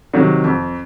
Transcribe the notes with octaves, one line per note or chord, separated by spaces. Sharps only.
C3 D#3 F#3
F2